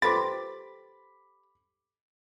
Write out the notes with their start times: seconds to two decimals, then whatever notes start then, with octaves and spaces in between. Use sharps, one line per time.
0.02 G4 A4 B4 C5 B5 C6 D6 A6